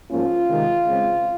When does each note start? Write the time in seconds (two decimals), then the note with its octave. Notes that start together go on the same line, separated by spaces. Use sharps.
0.11 G#2 F3 A#3 C#4 F4
0.49 C3 D#3 G#3
0.87 C#3 G#3 C4